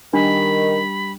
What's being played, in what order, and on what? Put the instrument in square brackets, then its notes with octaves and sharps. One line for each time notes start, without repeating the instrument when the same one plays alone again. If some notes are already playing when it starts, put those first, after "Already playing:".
[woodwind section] D#3 [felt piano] G3 [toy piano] D4 [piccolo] B5